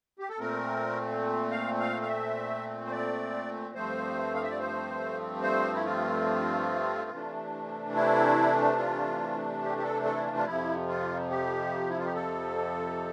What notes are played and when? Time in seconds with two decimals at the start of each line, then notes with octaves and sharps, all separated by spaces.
0.19 G4
0.29 A4
0.39 A#2 A3 C4 A#4
1.51 F5
1.80 F5
2.02 F5
2.07 E5
2.86 C5
2.91 D5
3.75 G2 F3 A3 C4 C5
4.34 F5
4.43 E5
4.50 D5
4.59 C5
5.42 C5
5.75 E4
5.85 F4
7.10 C3 E3 A3 D4
7.95 E4
8.78 F4
9.63 G4
9.78 G4
9.84 A4
10.05 A4
10.16 E4
10.26 F4
10.36 F4
10.46 F2 C3 F3 E4
10.88 F4
11.30 G4
11.90 E4
11.98 F4
12.06 G4
12.15 A4